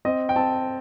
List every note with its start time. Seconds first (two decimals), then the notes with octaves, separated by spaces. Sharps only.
0.05 C4 D#5
0.29 G5
0.36 C4 A5